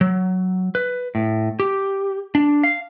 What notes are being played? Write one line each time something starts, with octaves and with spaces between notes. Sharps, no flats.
F#3
B4
A2
G4
D4
F5